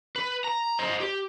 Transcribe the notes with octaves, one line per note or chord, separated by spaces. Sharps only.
B4
A#5
C5 D#5
G4